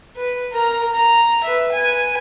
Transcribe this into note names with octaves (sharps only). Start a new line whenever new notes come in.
B4
A#4 A#5
A#5
B4 E5
B4 G#5